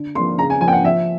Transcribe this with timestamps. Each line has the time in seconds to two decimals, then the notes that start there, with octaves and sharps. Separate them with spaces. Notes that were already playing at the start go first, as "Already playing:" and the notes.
Already playing: D3
0.15 F3 A#3 C6
0.38 C#3 A#5
0.50 G#5
0.61 F3 G#5
0.65 A#3 G5
0.72 F#5
0.84 F3 E5